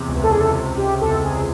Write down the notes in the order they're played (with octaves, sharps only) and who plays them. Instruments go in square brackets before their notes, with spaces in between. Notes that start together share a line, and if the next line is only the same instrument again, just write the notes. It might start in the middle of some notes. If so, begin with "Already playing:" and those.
Already playing: [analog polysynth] E2 C3
C#2
[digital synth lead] A4
G#4
A4
[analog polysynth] C3
[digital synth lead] G4
[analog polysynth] E2 [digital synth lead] A4
[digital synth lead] G#4